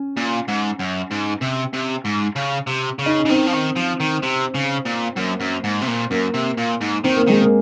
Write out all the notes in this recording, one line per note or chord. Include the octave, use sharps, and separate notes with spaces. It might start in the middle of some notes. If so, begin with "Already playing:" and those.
Already playing: C#4
A#2
G#2
F#2
G#2
C3
C3
G#2
C#3
C3
C#3
D#4
C#4
C#3
D#3 C4
F3
D#3
F3
D#3
C3
C#3
A#2
F#2 A#3
F#2
G#2
C3
A#2
F#2 A#3
C3
A#2
G#2
D#3 C4
A#3
D#3 G#3
A#3